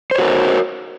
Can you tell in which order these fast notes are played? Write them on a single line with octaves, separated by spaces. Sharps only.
C5 C#5 F#4 A#4